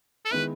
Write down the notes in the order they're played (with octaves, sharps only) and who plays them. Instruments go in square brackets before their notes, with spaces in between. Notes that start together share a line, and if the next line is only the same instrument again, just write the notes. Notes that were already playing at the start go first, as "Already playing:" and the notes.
[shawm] A4
[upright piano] D#3 G#3 B3 E4 [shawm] B4